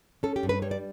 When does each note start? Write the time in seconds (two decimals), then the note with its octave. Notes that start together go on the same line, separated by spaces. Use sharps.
0.23 C#4 A4
0.36 G4
0.43 G2
0.49 B4
0.62 G3 C#5
0.71 D5